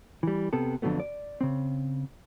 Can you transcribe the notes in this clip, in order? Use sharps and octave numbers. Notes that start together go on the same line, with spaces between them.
E3 G3
C3 B3 A4
F2 D3 D#3 F#3 A3 B3
D5
C#3 C4